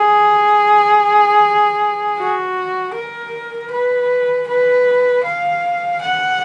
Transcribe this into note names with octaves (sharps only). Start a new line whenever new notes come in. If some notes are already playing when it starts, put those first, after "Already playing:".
Already playing: G#4
F#4
A#4
B4
B4
F5
F#5